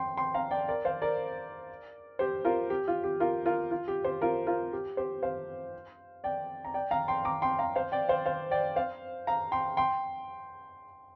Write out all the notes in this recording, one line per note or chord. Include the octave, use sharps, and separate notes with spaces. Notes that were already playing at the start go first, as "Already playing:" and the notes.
Already playing: G5 C6
G5 C6
F5 A#5
D5 G5
A#4 D5
C5 F5
A#4 D5
G4 C5
F4 A#4
G4
F4
G4
F4 A#4
F4 A#4
F4
G4
G4 C5
F4 A#4
F4 A#4
G4
G4 C5
C5 F5
D5 G5
A#5
D5 G5
F5 A#5
G5 C6
A#5 D6
G5 C6
F5 A#5
C5 F5
D5 G5
C5 F5
C5 F5
D5 G5
C5 F5
F5 A#5
G5 C6
G5 C6